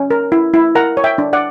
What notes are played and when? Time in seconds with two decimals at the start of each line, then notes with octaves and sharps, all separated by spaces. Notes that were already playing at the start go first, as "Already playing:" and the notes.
Already playing: C#4
0.11 A#4
0.32 E4
0.54 E4
0.75 A#4 F#5 A#5
0.97 C#5
1.04 E5 G5
1.18 D4
1.33 D5 F#5